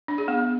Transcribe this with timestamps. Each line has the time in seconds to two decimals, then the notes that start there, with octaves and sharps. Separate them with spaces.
0.08 D4
0.18 G#4
0.28 B3